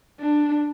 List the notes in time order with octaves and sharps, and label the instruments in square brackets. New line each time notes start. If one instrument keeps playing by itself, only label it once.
[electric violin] D4